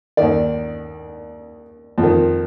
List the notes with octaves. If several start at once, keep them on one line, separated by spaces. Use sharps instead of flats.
D#2 D#3 D5
F2
D#3